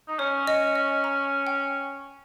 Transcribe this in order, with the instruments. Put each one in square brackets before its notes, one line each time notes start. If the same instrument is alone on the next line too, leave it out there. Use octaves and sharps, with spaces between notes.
[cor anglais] D#4
[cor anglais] C#4 [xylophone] C#5
[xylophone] D#5
D#5
A#5
G5